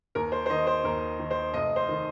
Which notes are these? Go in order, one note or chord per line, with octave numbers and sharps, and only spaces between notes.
D#2 A#4
C5
C5
D#3 D#5
C5
D#2 A#4
D#3
C5
F1 D#5
C5
D#3